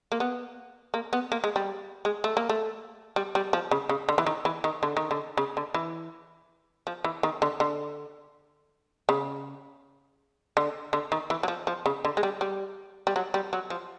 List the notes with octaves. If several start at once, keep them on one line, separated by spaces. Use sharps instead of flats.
A#3
B3
A#3
B3
A#3
G#3
G3
G#3
A3
A#3
A3
G3
G3
F3
C#3
C#3
D3
E3
D#3
E3
D#3
D3
D#3
D3
C#3
D3
E3
F3
E3
D#3
D3
D3
C#3
D3
D3
D#3
E3
F#3
F3
F3
C#3
D3
G#3
G3
G3
G3
F#3
G3
F#3
F3